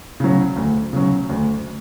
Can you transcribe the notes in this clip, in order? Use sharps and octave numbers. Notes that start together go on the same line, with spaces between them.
C#3 F#3
D2
C#3 F#3
D2